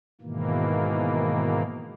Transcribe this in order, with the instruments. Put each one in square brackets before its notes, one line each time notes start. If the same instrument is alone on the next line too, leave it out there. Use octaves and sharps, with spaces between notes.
[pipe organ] G#2 B2 D#3 E3 A#3